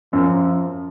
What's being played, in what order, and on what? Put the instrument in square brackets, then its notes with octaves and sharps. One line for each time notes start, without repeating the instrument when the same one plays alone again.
[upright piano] F#2 [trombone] F3